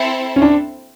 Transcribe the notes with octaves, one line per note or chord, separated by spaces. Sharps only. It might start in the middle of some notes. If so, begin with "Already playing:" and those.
Already playing: C4 E4 A4 C5 E5
C#4
D4